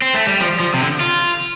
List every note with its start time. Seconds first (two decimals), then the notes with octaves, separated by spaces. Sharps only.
0.02 C4
0.15 A3
0.28 G3
0.41 F3
0.60 F3
0.74 C3
0.81 D3
1.01 F4